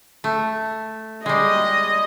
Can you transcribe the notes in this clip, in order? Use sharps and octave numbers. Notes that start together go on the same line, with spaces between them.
A3
G3 G#3 D#5